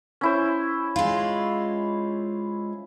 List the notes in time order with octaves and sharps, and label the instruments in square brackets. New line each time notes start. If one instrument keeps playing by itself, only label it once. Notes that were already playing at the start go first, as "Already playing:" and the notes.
[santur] C#4 E4 C5
[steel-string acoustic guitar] G#3 F4